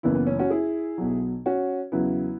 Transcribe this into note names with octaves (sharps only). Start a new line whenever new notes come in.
F#1 F#2 E3 B3 E4
B3
C#4
C#4 F#4
E4 G#4
B1 B2 F#3
C#4 F#4
E2 C#3 F#3 B3 E4